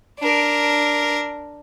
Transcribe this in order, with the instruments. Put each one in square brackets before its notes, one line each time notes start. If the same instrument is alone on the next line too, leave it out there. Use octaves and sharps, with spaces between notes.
[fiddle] D4 A#4